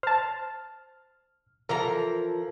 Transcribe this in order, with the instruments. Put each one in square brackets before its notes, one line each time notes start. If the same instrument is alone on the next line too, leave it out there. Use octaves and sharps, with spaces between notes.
[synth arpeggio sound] C5 A5 [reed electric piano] F6
[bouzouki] E3 F3 A#5 [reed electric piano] A4 A#4